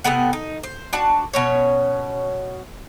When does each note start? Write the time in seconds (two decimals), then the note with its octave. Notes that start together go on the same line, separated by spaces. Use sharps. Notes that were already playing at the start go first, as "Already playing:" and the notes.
0.04 C3 A3 B3 F#5
0.33 D#4
0.63 C5
0.93 D4 F#4 A5
1.33 B2 C#4 C#5